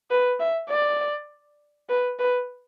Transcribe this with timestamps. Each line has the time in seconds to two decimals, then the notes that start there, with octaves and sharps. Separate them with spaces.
0.11 B4
0.40 E5
0.70 D5
1.89 B4
2.19 B4